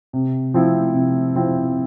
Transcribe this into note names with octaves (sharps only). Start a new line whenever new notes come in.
C3
F3 C4 E4
C3
F3 C4 E4